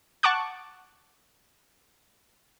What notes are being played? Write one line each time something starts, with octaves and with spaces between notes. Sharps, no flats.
F#5 A5 C#6 D6 F#6